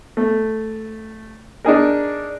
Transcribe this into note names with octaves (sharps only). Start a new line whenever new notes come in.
A3
D4 D#4 G#4 A#4